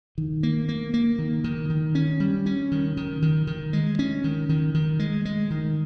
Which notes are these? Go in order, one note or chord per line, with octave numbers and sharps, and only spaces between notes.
D#3
A#3
A#3
A#3
D#3
D#3
D#3
C#4
G3
C#4
D#3
D#3
D#3
D#3
G#3
C#4
D#3
D#3
D#3
G#3
G#3
D#3